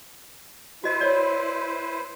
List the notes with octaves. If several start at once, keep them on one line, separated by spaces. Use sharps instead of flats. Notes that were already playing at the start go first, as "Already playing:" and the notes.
E4 F#4 B4 C5 D#5
C#5 D5